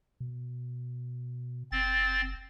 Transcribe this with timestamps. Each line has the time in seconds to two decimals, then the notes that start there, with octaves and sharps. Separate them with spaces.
0.20 B2
1.72 F#1 C4 A6